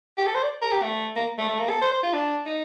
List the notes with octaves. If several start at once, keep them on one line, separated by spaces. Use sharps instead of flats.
G4
A4
C5
D5
A#4
G4
A3
A#3
A3
A3
A#3
A4
C5
C5
F4
D4
D#4